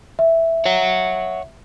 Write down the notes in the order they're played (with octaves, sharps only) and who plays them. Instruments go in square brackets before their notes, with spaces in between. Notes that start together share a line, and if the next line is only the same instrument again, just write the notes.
[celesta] E5
[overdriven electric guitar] C#5 F#5